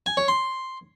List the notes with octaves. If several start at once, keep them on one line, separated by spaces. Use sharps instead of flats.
G#5
C#5
C6